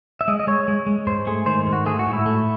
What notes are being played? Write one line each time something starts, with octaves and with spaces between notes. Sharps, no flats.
E5
G#3 D#5
D#5
G#3 C#5
G#3
G#3
G#2 C5
A3 G#4
D#3 C5
G#2
F#4
A3 G#4
F#4
A2
E4
A3